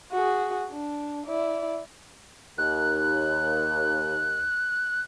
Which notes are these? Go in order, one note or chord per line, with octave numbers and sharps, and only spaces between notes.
F#4 G#4
D4
E4 D5
D#2 F#6